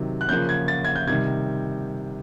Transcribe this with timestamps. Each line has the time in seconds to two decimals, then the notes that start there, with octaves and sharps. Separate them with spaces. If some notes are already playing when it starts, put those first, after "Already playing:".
Already playing: C3 D#3 F#3
0.21 F#6
0.29 C#3 F3 A#3 C#4 G6
0.49 G#6
0.68 A6
0.85 G#6
0.95 G6
1.07 C3 D#3 G3 G#6